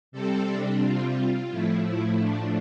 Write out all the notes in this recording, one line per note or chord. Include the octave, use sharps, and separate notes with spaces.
C3 G3 C4 A4
D4
F4
F4
A2 F3 A3 E4
E4
D4